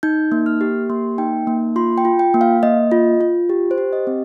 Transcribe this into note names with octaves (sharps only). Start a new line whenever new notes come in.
D#4 G6
A#3
F6
G4
A#3 C6
D#4 G5
A#3
F4 C6
G5
F4
G5
A#3
F5
A#3 D#5
F4
F4
G4
C5
G4
D#5
C4